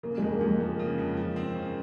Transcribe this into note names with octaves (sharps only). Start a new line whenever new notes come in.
C#3 A#3
G#3
F2
A#3
F2 G#3
F3 A#3
C#3
F2
F3
C4
C#3